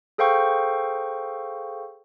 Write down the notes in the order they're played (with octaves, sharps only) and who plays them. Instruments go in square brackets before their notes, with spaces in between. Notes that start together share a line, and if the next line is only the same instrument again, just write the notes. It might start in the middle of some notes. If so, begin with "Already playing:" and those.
[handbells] G#4 A4 C5 F5 G5 C#6